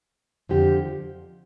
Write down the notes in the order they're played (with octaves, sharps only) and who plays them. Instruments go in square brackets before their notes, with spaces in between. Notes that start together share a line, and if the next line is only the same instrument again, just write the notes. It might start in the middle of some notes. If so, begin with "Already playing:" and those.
[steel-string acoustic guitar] F2 D3 F3 G4